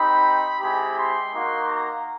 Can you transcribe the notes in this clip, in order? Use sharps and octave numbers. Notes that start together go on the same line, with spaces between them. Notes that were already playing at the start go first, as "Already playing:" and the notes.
Already playing: C4 D#4 G4 B5
G#3 C4 E4 G4 B5
C6
A#3 D#4 F#4
A#5